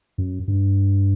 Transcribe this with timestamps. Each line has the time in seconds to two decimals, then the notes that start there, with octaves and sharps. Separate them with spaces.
0.18 F#2
0.48 G2